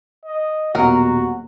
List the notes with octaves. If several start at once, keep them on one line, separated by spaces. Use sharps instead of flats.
D#5
D#1 B2 F#3 F#4 A#4 D#5